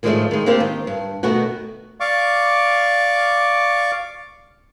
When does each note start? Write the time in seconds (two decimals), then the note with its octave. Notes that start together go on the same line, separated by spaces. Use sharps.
0.03 A2 D#3 F3 G#3 D5 E5
0.31 D#3 G#3
0.46 A#3 C4 D4 G4 A#4 C5
0.60 D#3
0.87 G2
1.23 B2 D#3 A3 B3 F#4
2.00 D5 F5 C#6 D6